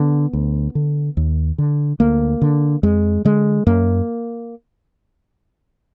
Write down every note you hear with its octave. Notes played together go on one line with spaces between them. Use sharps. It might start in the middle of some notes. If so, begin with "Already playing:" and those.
Already playing: D3 B3
D2
D3
D#2
D3
D2 A#3
D3
F2 G#3
D3 G#3
F#2 A#3